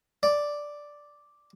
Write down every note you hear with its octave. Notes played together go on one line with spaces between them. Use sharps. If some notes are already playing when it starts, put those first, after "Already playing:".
D5